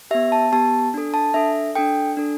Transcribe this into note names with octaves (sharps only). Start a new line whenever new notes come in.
B3 G4 E5
A5
B3 G4 A5
D4 A4
A5
D4 A4 E5
D4 A4 G5
D4 A4